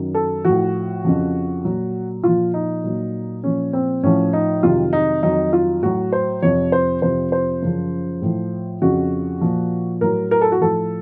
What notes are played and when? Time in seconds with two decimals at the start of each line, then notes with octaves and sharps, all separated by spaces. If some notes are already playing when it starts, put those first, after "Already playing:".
Already playing: F#2 D#3 F#3
0.14 A4
0.45 A2 F3 F#4
1.05 F2 C#3 F3
1.64 A#2 F#3
2.24 A#2 F3 F4
2.54 D#4
2.84 A#2 F#3
3.44 A#2 F3 C#4
3.73 C4
4.03 A2 F3 C#4
4.33 D#4
4.63 F2 C3 D#3 F#3 F4
4.93 D#4
5.23 F2 D#3 F#3 D#4
5.53 F4
5.82 A2 F#3 F#4
6.13 C5
6.42 F2 C3 F3 C#5
6.72 C5
7.02 F2 C3 F3 C5
7.32 C5
7.62 F#2 C#3 F3
8.22 A2 F3
8.82 F2 C#3 F3 F#4
9.41 A#2 F3
10.01 A2 F#3 A#4
10.31 A#4
10.41 A4
10.52 F#4
10.61 A2 F3 A4